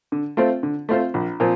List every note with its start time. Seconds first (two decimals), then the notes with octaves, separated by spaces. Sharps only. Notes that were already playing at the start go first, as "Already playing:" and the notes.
0.12 D3
0.37 A3 C4 F4 C5
0.63 D3
0.89 A3 C4 F4 C5
1.14 A#1
1.40 A#2 F3 C4 F4